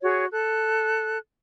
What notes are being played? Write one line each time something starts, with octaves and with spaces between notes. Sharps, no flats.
F#4 G#4 C#5
A4 F#6